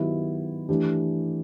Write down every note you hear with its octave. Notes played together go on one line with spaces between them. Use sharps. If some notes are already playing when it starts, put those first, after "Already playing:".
Already playing: D#3 F#3 B3 E4 G4
E3 A3 D4 G4